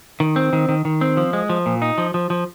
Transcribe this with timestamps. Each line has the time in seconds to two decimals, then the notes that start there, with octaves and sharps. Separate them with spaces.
0.20 D#3
0.36 C4
0.53 D#3
0.69 D#3
0.85 D#3
1.01 C4
1.17 F3
1.33 G#3
1.50 F3
1.66 A#2
1.82 D#4
1.98 F3
2.14 F3
2.30 F3